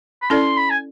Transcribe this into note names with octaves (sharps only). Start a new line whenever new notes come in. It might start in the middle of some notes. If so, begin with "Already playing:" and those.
B5
C#4 E4 A4 D5 C6
B5
G#5